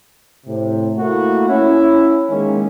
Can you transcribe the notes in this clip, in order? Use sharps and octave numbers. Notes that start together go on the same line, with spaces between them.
A2 C3
A3 A#3 E4 F#4
C#4 E4
D#3 G#3 A#3 C#4